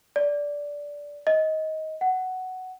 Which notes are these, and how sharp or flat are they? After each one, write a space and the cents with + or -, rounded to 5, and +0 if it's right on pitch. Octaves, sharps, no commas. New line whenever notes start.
D5 -10
D#5 +15
F#5 +10